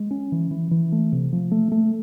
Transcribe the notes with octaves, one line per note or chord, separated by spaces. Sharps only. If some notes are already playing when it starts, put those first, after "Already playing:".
Already playing: G#3
C#4
E3
E3
E3
A3
C3
F3
A3
A3